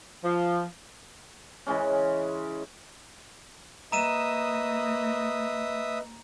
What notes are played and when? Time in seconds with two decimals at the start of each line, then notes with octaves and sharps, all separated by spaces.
0.23 F3
1.67 C#3 E3 G#3 C#4
3.92 A#3 B4 D#5 E5 A#5 D#6 D#7 E7